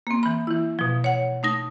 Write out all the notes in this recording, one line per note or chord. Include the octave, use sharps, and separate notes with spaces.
A#3 C4
E3 B5
E3 E4
B2 F3
C#5 F#5
A3 D#4 A#6